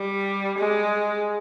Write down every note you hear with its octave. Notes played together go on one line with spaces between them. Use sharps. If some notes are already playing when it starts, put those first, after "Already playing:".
Already playing: G3
G#3